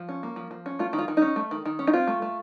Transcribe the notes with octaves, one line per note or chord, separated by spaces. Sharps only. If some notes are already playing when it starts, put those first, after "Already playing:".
Already playing: F3
C#4
A#3
F3
F3
C#4
A3 F4
D#3
F4
D#3
C#4 D#4
A3
D#3
D#3
C#4
D#4
C4 F4
A3
A3